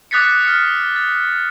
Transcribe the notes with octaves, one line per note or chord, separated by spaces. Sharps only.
D6 D#6 F#6 A6 B6 C#7
F6 C#7
A6